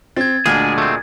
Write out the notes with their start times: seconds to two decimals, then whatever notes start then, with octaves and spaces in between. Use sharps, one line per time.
0.16 C4 G#6 A6
0.46 D2 A#2 G#3 D4 G#4
0.78 A3 C4